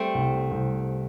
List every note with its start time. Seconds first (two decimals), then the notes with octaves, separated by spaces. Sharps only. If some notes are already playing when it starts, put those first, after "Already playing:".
Already playing: G3 A3 C4
0.15 C2
0.51 C2